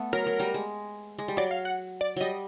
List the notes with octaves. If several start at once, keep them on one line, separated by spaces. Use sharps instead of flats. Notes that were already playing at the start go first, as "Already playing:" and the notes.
Already playing: A3 B3
F#3 A#4
F#3
G3
G#3
G#3
G3
F#3 D5
F5
F#5
D5
F#3 G3 D#5